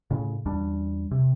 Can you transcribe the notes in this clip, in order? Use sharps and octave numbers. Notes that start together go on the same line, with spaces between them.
A2 C#3
E2 G3 D4
C3